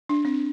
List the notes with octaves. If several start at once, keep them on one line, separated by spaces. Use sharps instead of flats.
D4
C4